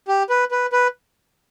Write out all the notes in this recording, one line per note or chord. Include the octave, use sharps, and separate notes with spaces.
G4
B4
B4
B4